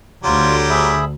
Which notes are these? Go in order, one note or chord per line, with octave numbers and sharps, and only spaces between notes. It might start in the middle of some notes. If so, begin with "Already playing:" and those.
D2 F#3 G3 F4
G#4 E5 B5